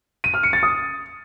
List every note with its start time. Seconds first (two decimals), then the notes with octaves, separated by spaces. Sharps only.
0.24 D#7
0.34 F6
0.43 C#7
0.53 A6
0.63 D#6